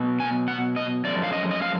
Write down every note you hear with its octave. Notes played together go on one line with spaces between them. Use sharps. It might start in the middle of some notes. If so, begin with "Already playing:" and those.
Already playing: B2 F#3 B3
G#5
F#5
D#5
F#2 F3 G#3 D5
F5
D#5
D#5
F5